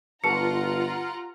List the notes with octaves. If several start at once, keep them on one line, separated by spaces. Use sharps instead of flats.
G1 F4 G4 B4 F#5 A5 A#5 C#7